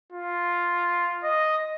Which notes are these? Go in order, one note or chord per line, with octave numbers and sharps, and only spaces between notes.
F4
D#5